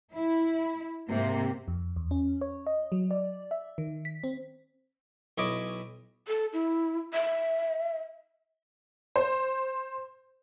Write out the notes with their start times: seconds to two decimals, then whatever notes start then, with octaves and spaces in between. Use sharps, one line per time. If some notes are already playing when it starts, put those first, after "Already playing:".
0.15 E4
1.09 G#2 C3 A#3
1.68 F2
1.96 E2
2.11 C#4
2.41 C#5
2.66 D#5
2.92 F#3
3.11 D5
3.51 E5
3.78 D#3
4.05 B6
4.24 C4
5.38 B1 E4 C#5 D#5 D6
6.28 A4
6.53 E4
7.14 E5
9.16 C5